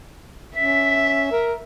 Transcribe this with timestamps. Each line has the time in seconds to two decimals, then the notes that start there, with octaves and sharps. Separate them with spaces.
0.56 C#4 E5 B6
1.32 A#4